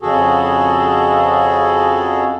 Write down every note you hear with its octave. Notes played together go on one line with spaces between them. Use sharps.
F2 C#3 F#4 G#4 A4